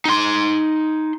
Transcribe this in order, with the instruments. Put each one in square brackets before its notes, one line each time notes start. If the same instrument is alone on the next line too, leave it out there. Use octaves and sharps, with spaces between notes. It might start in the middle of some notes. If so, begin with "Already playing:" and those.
[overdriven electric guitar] D#4 C6